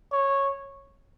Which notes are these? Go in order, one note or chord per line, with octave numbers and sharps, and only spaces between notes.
C#5